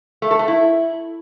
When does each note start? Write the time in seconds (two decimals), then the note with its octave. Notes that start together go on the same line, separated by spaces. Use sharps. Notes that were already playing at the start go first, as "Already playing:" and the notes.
0.22 A3
0.31 A4
0.39 A3
0.48 E4